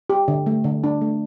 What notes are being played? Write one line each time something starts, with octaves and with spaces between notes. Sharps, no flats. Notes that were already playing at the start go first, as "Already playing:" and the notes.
G4
D3
A3
D3
D4
A3